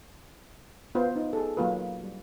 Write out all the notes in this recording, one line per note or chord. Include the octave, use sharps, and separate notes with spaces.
B3 F4 B4 C5
D#4
G#4 A4
F#3 A#3 F4 B4
G3